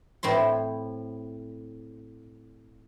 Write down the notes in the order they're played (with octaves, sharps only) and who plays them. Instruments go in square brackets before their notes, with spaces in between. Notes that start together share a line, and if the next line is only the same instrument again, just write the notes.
[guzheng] A2 C4 E4 C6